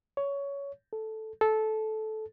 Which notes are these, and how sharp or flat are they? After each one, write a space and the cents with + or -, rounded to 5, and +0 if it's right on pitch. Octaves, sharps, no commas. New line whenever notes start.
C#5 +15
A4 -5
A4 -15